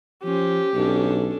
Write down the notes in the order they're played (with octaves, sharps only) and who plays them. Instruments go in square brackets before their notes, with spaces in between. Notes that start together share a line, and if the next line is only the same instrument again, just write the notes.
[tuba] F3 [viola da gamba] C#4 C5 [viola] G4
[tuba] B1 [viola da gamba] C#4 D4 A4